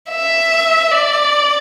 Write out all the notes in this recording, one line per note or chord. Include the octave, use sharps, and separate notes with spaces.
E5
D5